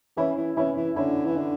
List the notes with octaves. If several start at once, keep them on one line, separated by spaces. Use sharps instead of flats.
E3 C#4 E4
E3
E3 C#4 E4
E3
D3 C#4 E4
E3
D3